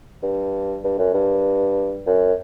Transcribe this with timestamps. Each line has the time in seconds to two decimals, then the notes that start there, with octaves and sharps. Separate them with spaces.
0.23 G2
0.84 G2
0.98 F#2
1.14 G2
2.07 F#2